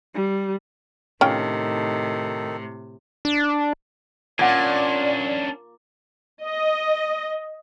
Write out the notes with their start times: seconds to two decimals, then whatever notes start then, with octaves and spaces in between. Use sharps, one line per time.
0.15 G3
1.21 A2 C3 D#3 C#4 D#4 F4 A4 G5
3.25 D4
4.39 A#2 C#4 D4 D5 F#5 G#6
6.44 D#5